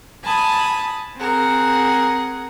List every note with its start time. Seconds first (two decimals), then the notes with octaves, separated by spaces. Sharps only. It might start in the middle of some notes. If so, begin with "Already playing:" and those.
0.23 G#5 A5 B5 D#6
1.16 C4 G#4 A#4 F#5